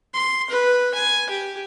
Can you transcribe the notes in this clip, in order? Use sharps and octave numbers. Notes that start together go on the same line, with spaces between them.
C6
B4
G#5
G4